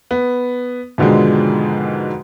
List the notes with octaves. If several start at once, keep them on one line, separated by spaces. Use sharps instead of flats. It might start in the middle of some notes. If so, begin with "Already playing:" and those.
B3
G#2 B2 D3 D#3 F3 G#3